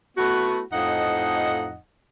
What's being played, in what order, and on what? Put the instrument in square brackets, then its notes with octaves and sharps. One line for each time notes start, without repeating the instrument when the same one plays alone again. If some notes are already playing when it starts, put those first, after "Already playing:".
[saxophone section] A3 B3 E4 F#4
F2 A2 F3 D#4 D#5 F#5